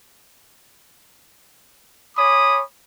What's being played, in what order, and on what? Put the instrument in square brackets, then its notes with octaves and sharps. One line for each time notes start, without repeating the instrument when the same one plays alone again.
[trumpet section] C#5 G#5 B5 D6 D#6